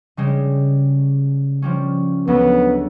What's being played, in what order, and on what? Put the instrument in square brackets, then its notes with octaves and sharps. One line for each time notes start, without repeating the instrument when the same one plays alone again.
[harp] C#3 G3 G#3
F3 G3 C#4
[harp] D2 F#3 G#3 [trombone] B3